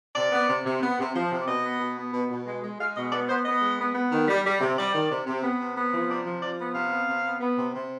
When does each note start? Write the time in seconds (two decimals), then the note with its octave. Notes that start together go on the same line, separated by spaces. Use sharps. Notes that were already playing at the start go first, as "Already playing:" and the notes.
0.16 C3 D5
0.32 B3
0.49 C3
0.65 C3
0.82 B3
0.98 C3
1.15 F3
1.31 C3
1.41 D5
1.48 B2 D#5
1.64 B3
1.80 B2
1.97 B3
2.13 B2
2.30 B2
2.47 G#3
2.63 G#3
2.80 G#3 F5
2.96 B2 D#5
3.12 B3 D5
3.29 B3 C5
3.45 B3 D#5
3.62 G#3
3.79 B3
3.95 B3
4.12 D#3
4.28 G3
4.44 G3
4.61 C3
4.78 G3 D5
4.94 D#3
5.10 C3
5.27 C3
5.43 B3
5.60 C3
5.76 B3
5.93 F3
6.10 C3 D5
6.26 F3
6.42 F3 D5
6.59 B3
6.75 C3 F5
6.92 B3
7.08 C3
7.24 B3
7.41 B3
7.58 C3
7.74 C3